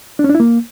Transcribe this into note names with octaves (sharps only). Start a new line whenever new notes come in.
D4
C#4
D4
E4
A#3